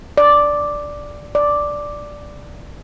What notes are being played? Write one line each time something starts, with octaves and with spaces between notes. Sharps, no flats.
D5
D5